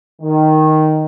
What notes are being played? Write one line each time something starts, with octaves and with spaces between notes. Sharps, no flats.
D#3